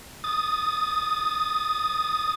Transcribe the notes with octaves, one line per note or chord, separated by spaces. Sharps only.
D#6 A6